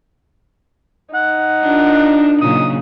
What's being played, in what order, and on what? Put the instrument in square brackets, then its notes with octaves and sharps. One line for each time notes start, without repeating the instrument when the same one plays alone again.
[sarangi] D#4 [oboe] F#5
[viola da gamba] D4 F4 A#4
[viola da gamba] A#2 C#3 F#3 [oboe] D#6